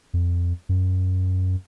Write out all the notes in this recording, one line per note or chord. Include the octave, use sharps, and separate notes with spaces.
F2
F#2